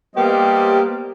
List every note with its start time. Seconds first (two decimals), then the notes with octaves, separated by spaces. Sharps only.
0.16 G3 A#3 B3 G4 C5 D#5